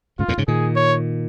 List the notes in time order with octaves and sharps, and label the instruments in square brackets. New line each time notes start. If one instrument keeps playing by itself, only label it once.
[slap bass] G#2 C#3 [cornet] F4
[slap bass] F2 A#2
G#2 C#3
[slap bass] A#2 D#3 [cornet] G#4
[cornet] C#5